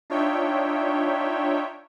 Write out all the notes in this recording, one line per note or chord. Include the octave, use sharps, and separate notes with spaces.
D4 D#4 F4 C#5 E5 G5